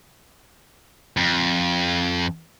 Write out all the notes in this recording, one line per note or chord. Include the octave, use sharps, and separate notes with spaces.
F2